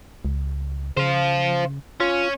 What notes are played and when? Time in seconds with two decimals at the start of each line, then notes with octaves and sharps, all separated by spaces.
0.25 C#2
0.97 C#3 C5 F5
2.00 C#4 F4